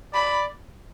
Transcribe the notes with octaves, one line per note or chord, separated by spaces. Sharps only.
D5 B5